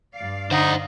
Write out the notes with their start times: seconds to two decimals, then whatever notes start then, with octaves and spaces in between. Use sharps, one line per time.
0.15 G2 D5 F5
0.51 D3 D#4 C5 F#5